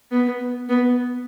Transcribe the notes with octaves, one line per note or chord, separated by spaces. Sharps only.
B3
B3